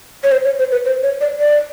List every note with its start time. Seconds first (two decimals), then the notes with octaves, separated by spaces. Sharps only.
0.24 C#5
0.32 C5
0.45 C#5
0.59 C5
0.72 B4
0.85 C5
1.03 C#5
1.21 D5
1.39 D5